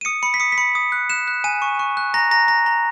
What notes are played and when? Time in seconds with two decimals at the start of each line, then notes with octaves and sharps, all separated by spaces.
0.01 D#7
0.05 D#6 C#7
0.23 B5 C#7
0.34 B6
0.40 D#6 C#7
0.52 B6
0.58 B5 C#7
0.75 D#6
0.92 F#6
1.10 F#6 E7
1.28 F#6
1.44 G#5 D#7
1.62 C#6
1.79 C#6
1.97 F#6
2.14 A#5 A#6
2.31 A#5 A#6
2.48 A#5 A#6
2.66 A#5